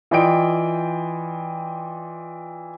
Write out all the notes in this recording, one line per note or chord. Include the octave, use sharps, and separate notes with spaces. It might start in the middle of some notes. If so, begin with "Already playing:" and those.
E3 F4 D5 D#5 G5 D7